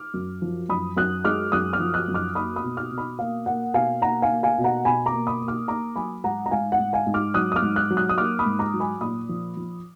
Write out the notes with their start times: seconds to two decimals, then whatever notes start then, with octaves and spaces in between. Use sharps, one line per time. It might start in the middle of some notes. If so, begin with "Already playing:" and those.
Already playing: D6 F6
0.14 F#2
0.42 F3
0.69 F#2 B5 D#6
0.97 F#2 D#6 F#6
1.25 G#3 D6 F6
1.52 F#2 D#6 F#6
1.73 D6 F6
1.80 F3
1.94 D#6 F#6
2.08 F#2
2.14 D6 F6
2.35 A#3 B5 D#6
2.56 B5 D#6
2.63 B2
2.77 D6 F6
2.91 B2
2.98 B5 D#6
3.19 A#3 F5
3.46 A#3 F#5
3.74 B2 F5 G#5
4.02 A#3 F#5 A#5
4.22 F5 G#5
4.29 A#3
4.43 F5 G#5
4.58 B2
4.64 F#5 A#5
4.85 B2 G#5 B5
5.06 A#5 D6
5.13 A#3
5.27 B5 D#6
5.41 A#3
5.48 D6 F6
5.68 A#3 A#5 D6
5.96 F#3 G#5 B5
6.24 G#2 F#5 A#5
6.46 A#5
6.51 G#2 F5 G#5
6.72 F#5
6.79 G#2
6.93 F5 G#5
7.07 G#2
7.14 D6 F6
7.34 F#3 D#6 F#6
7.52 D#6
7.56 D6 F6
7.62 G#2
7.76 D#6 F#6
7.90 F#3
7.97 D#6 F#6
8.09 D#6
8.18 A#3 D6 F6
8.39 B5 D#6
8.46 G#2
8.59 A#5 D6
8.74 F#3
8.80 G#5 B5
9.01 A#2 B5 D#6
9.29 F3
9.57 F3